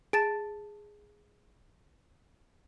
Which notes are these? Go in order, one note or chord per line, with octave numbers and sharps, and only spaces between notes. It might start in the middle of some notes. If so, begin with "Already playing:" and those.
G#4 A5 A6 D7